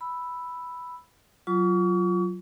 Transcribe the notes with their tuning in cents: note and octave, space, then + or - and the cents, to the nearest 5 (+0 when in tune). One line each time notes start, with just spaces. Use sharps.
B5 +0 E6 +0
F#3 +0 F4 +0 C#6 +40